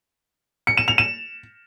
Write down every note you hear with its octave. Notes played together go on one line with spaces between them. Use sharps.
C#7
E7
F7
E7